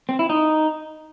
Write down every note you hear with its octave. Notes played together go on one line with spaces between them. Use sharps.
C4
E4
D#4